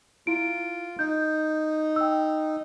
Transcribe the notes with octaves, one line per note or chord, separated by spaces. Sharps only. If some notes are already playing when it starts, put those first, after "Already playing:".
E4 F4 D7
D#4 G6
G5 E6